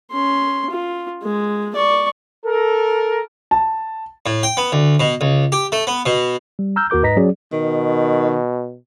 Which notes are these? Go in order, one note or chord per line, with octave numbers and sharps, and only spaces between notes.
C#4 C6
F4
G#3
D5 C#6
A4 A#4
A5
A2
G5
B3
D2
B2
C#2
G4
A3
B3
B2
G3
A#5 E6 F6 G6
D#2 F#4 A#4 D6 G6
G#2 B4 D#5 A#5 A#6 B6
F#3 C#4 G#4 D5
B2 D#3